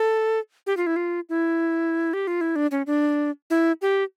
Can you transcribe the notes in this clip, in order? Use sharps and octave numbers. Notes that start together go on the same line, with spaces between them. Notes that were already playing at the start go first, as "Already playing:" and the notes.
Already playing: A4
G4
F4
E4
F4
E4
G4
F4
E4
D4
C#4
D4
E4
G4